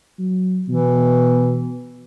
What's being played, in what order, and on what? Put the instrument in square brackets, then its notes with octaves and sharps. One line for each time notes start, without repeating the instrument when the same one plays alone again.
[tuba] F#3
[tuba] B2 [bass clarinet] E3